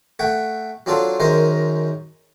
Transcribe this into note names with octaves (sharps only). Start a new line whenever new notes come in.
A3 F#5 G5
F#3 C4 D4 F4 A4
F#2 D#3 G#3 A#4 C5